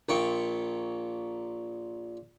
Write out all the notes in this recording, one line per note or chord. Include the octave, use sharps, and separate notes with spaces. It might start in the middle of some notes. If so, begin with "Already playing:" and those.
A#1 A#2 G5 C#6